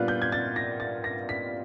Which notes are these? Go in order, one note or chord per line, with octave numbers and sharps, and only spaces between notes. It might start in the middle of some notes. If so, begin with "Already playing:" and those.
Already playing: A#2 G3 B3 D4 F4 F#6
G6
G#6
A6
A#6
A6
A#6
B6